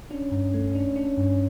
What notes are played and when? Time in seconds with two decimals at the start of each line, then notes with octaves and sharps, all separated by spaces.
0.11 C#4 D4
0.32 G2
0.54 A3
0.75 D4
0.96 D4
1.17 G2